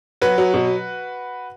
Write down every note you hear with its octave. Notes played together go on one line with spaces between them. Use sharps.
F#3 F#4 B4
F#3
B2